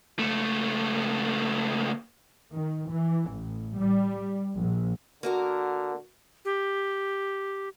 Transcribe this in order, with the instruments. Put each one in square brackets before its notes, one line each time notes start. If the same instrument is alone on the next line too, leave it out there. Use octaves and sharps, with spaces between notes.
[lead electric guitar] C#2 A3
[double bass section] D#3
E3
A1
G3
A#1
[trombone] D3 [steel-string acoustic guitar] A#3 F#4 A#4
[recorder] G4